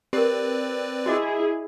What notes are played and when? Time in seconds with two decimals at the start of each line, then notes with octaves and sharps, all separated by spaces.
0.13 C4 G4 A#4 B4 D5
1.06 E4 F#4 G#4 D#5 D6